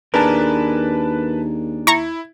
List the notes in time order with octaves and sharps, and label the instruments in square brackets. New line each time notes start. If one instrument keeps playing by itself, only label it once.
[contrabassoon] D#2 [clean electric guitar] D4 G#4 A#4 [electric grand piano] B4 A5
[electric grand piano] E4 [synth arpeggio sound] A#5 C#6